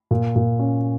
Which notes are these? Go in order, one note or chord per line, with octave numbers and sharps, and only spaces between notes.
A#2
A#2
C#4